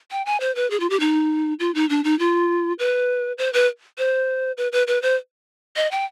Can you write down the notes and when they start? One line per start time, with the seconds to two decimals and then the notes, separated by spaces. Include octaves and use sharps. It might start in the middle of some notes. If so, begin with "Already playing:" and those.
0.11 G5
0.26 G#5
0.40 C5
0.55 B4
0.71 G#4
0.80 F4
0.90 G4
1.00 D#4
1.60 F4
1.75 D#4
1.89 D4
2.04 D#4
2.19 F4
2.79 B4
3.38 C5
3.53 B4
3.98 C5
4.57 B4
4.72 B4
4.87 B4
5.02 C5
5.76 D#5
5.91 G5